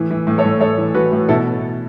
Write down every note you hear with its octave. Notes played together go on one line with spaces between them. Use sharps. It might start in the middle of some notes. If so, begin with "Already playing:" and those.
Already playing: A2 E3
E3
A2
A4 C#5
A2
A2 A4 C#5
E3
E3 F#4 B4
A2
B2 E4 A4